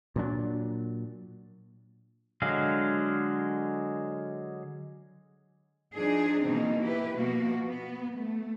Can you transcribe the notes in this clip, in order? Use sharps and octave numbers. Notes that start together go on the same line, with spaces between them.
A#2 F#3 D4
D3 F#3 G#3 F5
F3 D4 D#4 G#4
B2 D#3 E3 A#3 C4 D#4
E4 G4 B4
B2 F3 A#3 B3 F#4
B3
A3